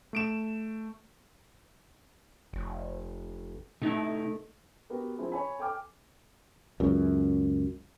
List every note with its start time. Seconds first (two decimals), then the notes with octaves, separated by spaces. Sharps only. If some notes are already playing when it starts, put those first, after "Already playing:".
0.13 A3 D7 E7
2.53 F1
3.82 C3 A3 D#4 E4
4.90 B3 F#4 G4 A#4
5.17 F3 C4 E4 G#4 A#4
5.32 C#5 G#5 B5
5.59 A4 G5 G#5 D6 F6
6.80 C#2 F#2